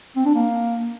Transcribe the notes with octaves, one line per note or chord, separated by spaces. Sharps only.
C4
D4
A#3